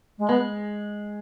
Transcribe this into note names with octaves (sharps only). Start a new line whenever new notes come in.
G#3
G#3 B3